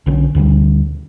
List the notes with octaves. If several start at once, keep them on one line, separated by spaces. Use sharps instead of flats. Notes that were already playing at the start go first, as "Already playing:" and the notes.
B1 D3 C#4
D2 D3 F#3 G3